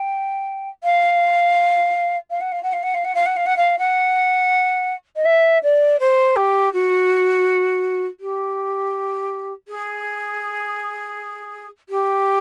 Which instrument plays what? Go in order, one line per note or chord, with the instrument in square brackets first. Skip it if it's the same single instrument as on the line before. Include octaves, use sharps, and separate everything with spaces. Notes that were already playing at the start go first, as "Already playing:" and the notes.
Already playing: [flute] G5
F5
F5
F#5
F5
F#5
F5
F#5
F5
F#5
F5
F#5
F5
F#5
F5
F#5
D#5
E5
D5
C5
G4
F#4
G4
G#4
G4